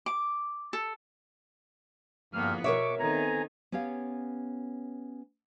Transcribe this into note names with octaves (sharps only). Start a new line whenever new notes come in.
D6
A4
E2 G2 D3 F3 A#3 B3 F6
B2 A#4 C#5 E5 C#6 D6
D#3 B3 C4 A4 G#5 A#5
B3 C#4 G4 C#5 F5